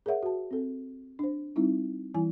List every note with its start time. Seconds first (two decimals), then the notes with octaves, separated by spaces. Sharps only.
0.06 G#4 A#4 C#5 E5 F#5
0.23 F#4 A5
0.51 C4 A4
1.19 D4 C5
1.56 G3 C4 D#4 E4
2.14 E3 G3 E4 G#5